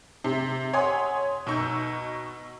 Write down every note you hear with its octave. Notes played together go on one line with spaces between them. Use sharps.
C3
C#5 F#5 G#5 C6 D#6
B2 D#4 C#6 E6 G6